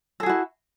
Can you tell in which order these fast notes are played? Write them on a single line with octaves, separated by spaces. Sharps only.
A4 G#4 F#4 E4